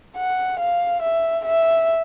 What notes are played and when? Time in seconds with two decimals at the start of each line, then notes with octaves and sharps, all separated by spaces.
0.17 F#5
0.60 F5
1.03 E5
1.46 E5